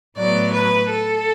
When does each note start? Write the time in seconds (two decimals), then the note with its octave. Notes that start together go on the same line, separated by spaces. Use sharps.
0.16 A2 F#3 B3 D5
0.53 B4
0.89 A4